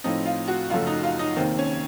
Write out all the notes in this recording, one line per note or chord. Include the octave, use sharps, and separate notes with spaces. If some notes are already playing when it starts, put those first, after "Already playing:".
A2 F3 C4 D#4
F4
F#4
F#1 F#2 F3 A3 F4
D#4
F4
D#4
F1 D#2 D#3 A#3 C4
C#4